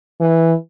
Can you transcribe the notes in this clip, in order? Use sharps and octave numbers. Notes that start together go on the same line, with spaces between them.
E3